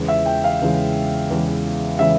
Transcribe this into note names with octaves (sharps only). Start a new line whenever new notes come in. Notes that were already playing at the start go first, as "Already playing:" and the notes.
Already playing: E2 C#3 E3 G#3
E5
G5
F5
E2 C#3 E3 G#3
E2 C#3 E3 G#3
C#3 E3 G#3 E5